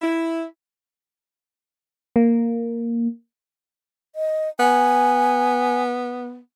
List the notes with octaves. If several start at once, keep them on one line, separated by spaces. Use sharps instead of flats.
E4
A#3
D#5
B3 G#5